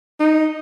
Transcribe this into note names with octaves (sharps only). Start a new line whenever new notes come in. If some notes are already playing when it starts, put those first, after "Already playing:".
D#4